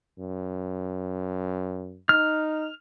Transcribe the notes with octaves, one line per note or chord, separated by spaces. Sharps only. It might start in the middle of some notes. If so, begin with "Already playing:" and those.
F#2
D#4 F6